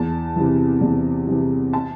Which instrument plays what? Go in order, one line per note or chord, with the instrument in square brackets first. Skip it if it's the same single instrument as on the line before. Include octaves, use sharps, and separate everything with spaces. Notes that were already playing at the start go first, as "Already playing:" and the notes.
Already playing: [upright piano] E2 A5
C3 E3
E2
C3 E3
A5